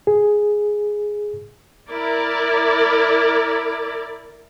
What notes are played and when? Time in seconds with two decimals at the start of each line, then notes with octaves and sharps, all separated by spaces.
0.07 G#4
1.90 E4 A#4 D5